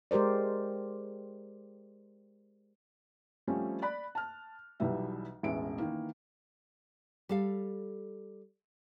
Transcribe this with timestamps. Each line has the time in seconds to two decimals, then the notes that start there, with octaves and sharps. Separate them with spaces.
0.11 G#3 G4 A#4 C5 D5
3.47 F3 G3 A3 C4 C#4
3.82 D5 B5 F#6
4.15 A5 F6
4.80 B1 B2 E3 G3 E5
5.43 E1 A1 G#3 B4 E5 D7
5.78 D#3 E3 A#3
7.29 G3 A4 F5